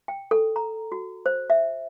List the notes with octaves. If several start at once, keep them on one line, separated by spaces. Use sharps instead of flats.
G5
A4
A#5
F#4
C5
E5